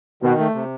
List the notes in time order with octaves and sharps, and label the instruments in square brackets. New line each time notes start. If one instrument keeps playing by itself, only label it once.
[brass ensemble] B2 [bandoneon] D#3
[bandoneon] A3
C3